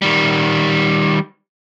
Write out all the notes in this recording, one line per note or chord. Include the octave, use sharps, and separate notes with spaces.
D#3 G3